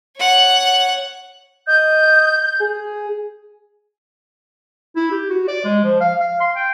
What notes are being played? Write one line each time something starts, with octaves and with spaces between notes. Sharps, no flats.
C#5 F#5
D#5 G6
G#4
E4
G4
F#4
D5
G#3
F3
F5
F5
C6
G5